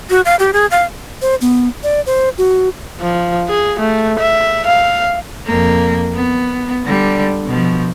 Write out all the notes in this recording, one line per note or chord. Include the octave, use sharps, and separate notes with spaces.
F#4
F5
G4
G#4
F5
C5
B3
D5
C5
F#4
F3
G#4
A3
E5
F5
F2 A#3
B3
D3 G3
B2 F3